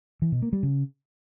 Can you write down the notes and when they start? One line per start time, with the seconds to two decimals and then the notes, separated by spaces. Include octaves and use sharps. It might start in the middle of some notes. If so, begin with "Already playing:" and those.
0.22 E3
0.32 B2
0.42 A#3
0.53 G3
0.63 C#3